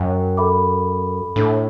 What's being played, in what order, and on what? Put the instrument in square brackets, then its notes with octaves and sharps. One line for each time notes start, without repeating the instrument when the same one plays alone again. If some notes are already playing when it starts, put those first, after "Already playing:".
Already playing: [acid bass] F#2 [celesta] C#5 G5
[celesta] A4 E5 B5 D6
[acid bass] A2 [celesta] D4 A4 E5